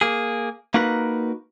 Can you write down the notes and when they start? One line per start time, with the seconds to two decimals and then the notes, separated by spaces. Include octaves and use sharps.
0.01 A#3 G#4
0.74 A#3 D#4 F#4 A#4 B4